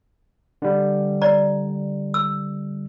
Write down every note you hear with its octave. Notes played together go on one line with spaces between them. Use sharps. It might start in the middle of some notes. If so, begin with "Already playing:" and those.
D3 G3
D5 A#5
E6